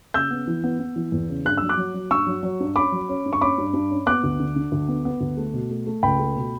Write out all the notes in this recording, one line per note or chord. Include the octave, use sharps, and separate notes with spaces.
C#3 E6 G6
B3
E3
B3
B3
E3
E2
C#3
G2 F#6
F#3 E6
D6 F#6
F#3
F#3
G2 C#6 E6
F#3
F#3
G2
C#4 B5 D6
F#3
C#4
G2
C#6
C#4 B5 D6
G2
G2
C#4
B3 D6 F#6
D2
D3
D3
D2
B3
B3
D2
A3
B2
A3
A3
C#2 G5 B5
A3
B2